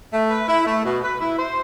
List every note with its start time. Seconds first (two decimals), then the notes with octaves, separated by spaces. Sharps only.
0.12 A3
0.30 B4
0.48 E4
0.66 A3
0.84 B2
1.03 B4
1.21 E4
1.38 C5